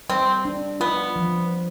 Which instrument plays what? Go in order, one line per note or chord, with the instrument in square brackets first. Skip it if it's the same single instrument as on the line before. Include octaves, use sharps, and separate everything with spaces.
[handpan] G3 [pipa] C4
[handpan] D4
[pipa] B3 [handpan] F4
[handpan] F3